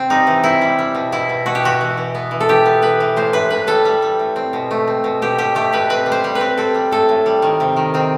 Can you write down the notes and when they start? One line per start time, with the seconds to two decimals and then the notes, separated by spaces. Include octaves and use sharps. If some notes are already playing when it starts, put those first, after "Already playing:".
Already playing: C3 C4
0.10 G3 D#4
0.27 E3
0.44 C4 E4
0.61 G3
0.79 G3
0.95 B2
1.12 B2 E4
1.29 B2
1.46 B2 F#4
1.55 G4
1.63 B2 F#4
1.81 E3
1.97 E3
2.15 B3
2.31 E3
2.40 A4
2.49 B3 G4
2.66 B3
2.82 E3 B4
3.00 E3
3.16 A2 C5
3.33 A2 B4
3.50 A2 B4
3.67 G3 A4
3.85 G3
4.02 G3
4.19 A2
4.36 C4
4.53 B2
4.71 A3
4.87 C4
5.04 B2
5.22 B2 G4
5.38 B2 G4
5.55 A3 G4
5.73 B2 B4
5.90 C4 B4
6.06 G3
6.12 C5
6.24 G3
6.35 B4
6.41 C4
6.58 C4 A4
6.74 G3
6.92 A2 A4
7.09 A2
7.26 G3
7.42 D#3
7.60 C3
7.76 D#3
7.94 D#3 C4